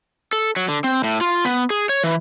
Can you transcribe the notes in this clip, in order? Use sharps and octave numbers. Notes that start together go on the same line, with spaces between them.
A4
F#3
D3
C4
A2
F4
B3
G#4
C#5
E3